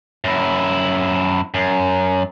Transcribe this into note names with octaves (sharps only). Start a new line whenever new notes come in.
F#2 E4
F#2